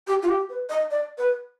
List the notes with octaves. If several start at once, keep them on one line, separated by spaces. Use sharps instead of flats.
G4
F4
G4
B4
D#5
D5
B4